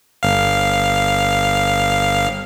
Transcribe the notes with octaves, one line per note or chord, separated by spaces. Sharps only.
G1 F5